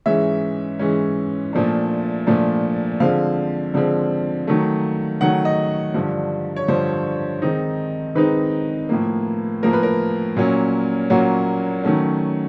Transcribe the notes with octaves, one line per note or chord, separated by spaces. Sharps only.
G#2 E3 G#3 C#4 E5
G#2 E3 G#3 C#4
A#2 F3 A3 D4
A#2 F3 A3 D4
D3 F3 G#3 C4 F5
D3 F3 G#3 C4
D#3 F#3 A3
D#3 F#3 A3 F#5
D#5
G2 D3 F3
C#5
G2 D3 F3 C5
D#3 G#3 C4 D#4
D#3 G#3 C4 D#4 B4
A2 F3 A#3
A2 F3 A#3 A#4
B4
A#4
A#2 F#3 A#3 C#4
A#2 F#3 A#3 C#4 F#4
D#3 F#3 A3 C#4